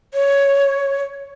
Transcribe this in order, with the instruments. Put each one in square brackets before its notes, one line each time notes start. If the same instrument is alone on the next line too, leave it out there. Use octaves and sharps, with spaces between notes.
[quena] C#5